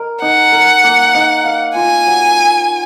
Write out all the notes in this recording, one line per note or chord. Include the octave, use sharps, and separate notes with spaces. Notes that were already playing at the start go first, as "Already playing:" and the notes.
Already playing: A#4 D#5
D#4 F#5
A#4
A#3
D#4
F5
F4 G#5
F#3